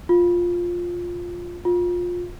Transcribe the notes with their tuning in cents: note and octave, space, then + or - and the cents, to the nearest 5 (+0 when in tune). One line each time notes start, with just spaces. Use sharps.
F4 +5
F4 +20